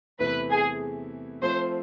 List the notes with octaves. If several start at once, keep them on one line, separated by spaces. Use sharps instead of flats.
E2 C3 E3 A3 E4 B4
G#4
F3 A3 C4 F4 C5